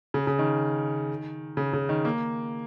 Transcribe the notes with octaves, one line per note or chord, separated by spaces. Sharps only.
C#3
C#3
D#3
C#3
C#3
D#3
A#3